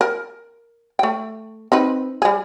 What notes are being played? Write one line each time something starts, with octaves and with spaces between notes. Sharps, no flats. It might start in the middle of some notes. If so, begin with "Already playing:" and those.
A#4
A3 G5
C4 D#4 B4
G3 G#4